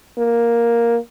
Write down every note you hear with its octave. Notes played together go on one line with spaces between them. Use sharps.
A#3